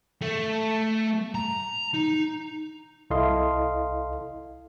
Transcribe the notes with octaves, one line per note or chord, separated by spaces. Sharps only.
A3
A#5
D#4
C2 E4 A4 D#5 F5 C6